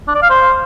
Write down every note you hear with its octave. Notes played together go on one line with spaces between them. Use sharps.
D4
D5
F5
C5